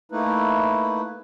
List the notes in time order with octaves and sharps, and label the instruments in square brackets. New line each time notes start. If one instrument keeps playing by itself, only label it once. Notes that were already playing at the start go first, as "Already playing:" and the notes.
[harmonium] A3 A#3 D#4 E4 B4